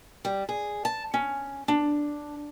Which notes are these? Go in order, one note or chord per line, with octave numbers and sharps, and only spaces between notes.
G3
G#4
A5
C#4
D4